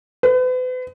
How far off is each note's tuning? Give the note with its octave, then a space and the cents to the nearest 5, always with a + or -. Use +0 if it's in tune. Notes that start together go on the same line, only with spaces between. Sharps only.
B4 +40